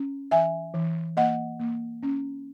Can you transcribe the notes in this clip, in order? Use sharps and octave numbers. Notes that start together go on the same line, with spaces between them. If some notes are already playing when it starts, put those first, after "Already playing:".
Already playing: C#4
E3 E5 G#5
E3
A#3 D#5 F#5
A#3
C#4